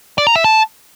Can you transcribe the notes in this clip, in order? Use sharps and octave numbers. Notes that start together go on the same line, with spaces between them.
D5
A#5
E5
A5